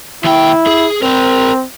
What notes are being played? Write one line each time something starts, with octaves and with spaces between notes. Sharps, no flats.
D#2 E4 G5
G#4
C4 A#4 C5